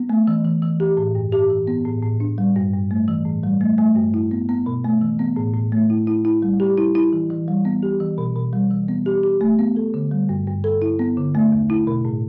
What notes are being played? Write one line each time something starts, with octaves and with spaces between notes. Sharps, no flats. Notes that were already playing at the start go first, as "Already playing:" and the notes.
Already playing: B3
A3
E3
E3
E3
G4
A2
G2
G4
E3
B3
A2
A2
D4
G3
G2
G2
A3
E3
A2
G3
A3
A3
G2
E4
B3
B3
B2
A3
E3
B3
A2
A2
A3
E4
E4
E4
G3
G4
E4
E4
E3
E3
G3
B3
G4
E3
B2
B2
G3
E3
B3
G4
G4
A3
B3
A4
D3
G3
G2
G2
A4
E4
B3
D3
A3
E2
E4
B2
A2